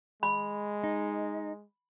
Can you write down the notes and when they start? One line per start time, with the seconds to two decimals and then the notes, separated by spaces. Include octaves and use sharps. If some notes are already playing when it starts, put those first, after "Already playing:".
0.23 G#3 B5
0.84 D#4